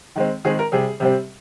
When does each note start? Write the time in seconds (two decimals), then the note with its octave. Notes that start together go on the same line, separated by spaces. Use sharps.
0.16 D#3 G#3 C4
0.45 D#3 G#3 C4 G#4
0.59 A#4
0.72 C3 G3 C4 G#4
1.00 C3 G3 C4